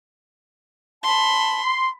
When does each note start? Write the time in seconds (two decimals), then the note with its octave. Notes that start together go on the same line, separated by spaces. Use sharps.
1.03 A5 B5 C6
1.62 C6